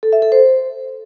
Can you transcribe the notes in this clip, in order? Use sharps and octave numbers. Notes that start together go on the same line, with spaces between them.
A4
E5
A4
C5